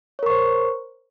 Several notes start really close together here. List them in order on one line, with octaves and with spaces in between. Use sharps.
C#5 A#4 C#6 C5